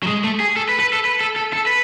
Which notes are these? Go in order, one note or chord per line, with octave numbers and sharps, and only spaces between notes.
F#3
G#3
A3
G#4
A4
B4
B4
A4
B4
A4
A4
A4
B4